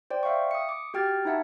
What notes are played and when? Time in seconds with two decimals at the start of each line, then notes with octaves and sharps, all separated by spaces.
0.10 C5 D5 G5
0.23 E5 F5 G5 C#6
0.51 D#6 C#7
0.69 D6
0.94 F#4 G4 G5 F6 G#6 A6
1.25 D#4 E4 E5 F#5 A5